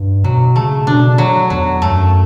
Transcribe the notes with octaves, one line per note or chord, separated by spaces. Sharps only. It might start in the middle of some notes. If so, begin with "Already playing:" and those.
Already playing: G2
B2 F#3
C#3 A3
B2 D4
F#3
E2 F#3
F#2 A3